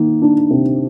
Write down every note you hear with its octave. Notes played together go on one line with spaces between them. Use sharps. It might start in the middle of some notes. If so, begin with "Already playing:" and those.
Already playing: D#3 A#3
D4
C3